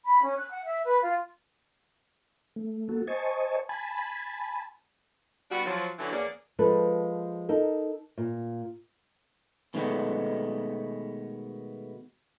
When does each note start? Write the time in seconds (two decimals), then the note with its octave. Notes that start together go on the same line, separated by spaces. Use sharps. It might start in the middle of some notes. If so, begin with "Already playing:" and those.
0.04 B5
0.22 C#4
0.38 F#6
0.51 F#5
0.64 E5
0.85 B4
1.02 F4
2.56 A3
2.89 A#3 F#4 A4
3.07 C5 D#5 G#5 A5 C#6
3.69 G#5 A5 B5
5.51 G3 B3 D4 F#4
5.66 F3 F#3
5.99 D3 E3 F#3
6.12 E2 A#3 B3 C#4 G#4 D5
6.59 F3 G#3 A4 B4
7.49 D#4 A4 A#4
8.18 A#2
9.74 B2 D#3 G#3 A3 B3